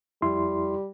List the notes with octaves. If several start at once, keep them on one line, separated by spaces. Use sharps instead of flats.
F2 G3 E4 C6